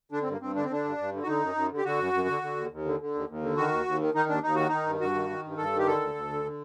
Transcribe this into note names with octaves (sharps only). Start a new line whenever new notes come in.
D3 D4
C4
G2 A#3
G2 C4
D3 D4
C4
D3 D4
G2
G2
D3
F#4
D3 D#4
F#2
F#2
D3
G4
D3 F#4
F#2
F#2
D3
D3
D#2
D#2
D3
D3
D#2
D#2
D3
D#3 F#4
D#2
D#2
D#3
D#3 D#4
D#2 D4
D#2 D#4
D#3 F#4
D#3 D#4
G2
G2 F#4
D#3
D#3
G2
G2 A4
D#3
G4
D3 A4
D2
D2
D3
D3